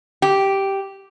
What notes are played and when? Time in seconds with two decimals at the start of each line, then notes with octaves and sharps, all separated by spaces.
0.22 G4